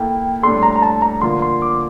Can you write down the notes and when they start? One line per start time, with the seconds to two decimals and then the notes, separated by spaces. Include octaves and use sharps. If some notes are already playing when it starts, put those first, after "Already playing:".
Already playing: A#3 E4 A4 G5
0.43 A2 G3 D4 A4 C6
0.63 A#5
0.76 A#5
0.82 A5
1.02 A#5
1.22 D3 F3 A#3 F4 A#4 C6
1.42 C6
1.62 D6